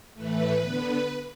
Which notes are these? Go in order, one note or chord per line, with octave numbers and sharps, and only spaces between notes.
A2 E3 A3 B4
D3 B3